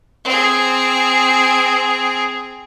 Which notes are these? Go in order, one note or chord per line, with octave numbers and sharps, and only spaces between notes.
C4 G#4